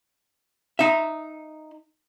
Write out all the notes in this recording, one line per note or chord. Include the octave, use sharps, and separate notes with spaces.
D#4 E5